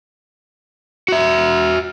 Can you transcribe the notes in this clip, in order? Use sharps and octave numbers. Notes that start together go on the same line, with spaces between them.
F#4 E5